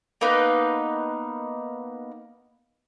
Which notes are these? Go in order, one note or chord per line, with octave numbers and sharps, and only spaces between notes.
A#3 B3 D#4 B4